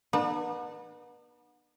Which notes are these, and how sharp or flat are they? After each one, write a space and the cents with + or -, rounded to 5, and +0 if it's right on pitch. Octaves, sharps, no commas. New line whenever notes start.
B3 -30 D4 +45